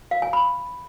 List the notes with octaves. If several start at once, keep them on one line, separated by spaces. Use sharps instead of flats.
F5
G#5
B5